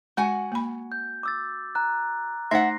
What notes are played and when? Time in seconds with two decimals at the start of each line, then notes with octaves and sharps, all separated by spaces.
0.17 G#3 F#4 F#5 G#5
0.52 A#3 B5
0.92 G6
1.23 D6 E6 A6
1.75 A#5 F#6
2.51 A3 D#4 C5 E5 F#5 C6 A#6 C7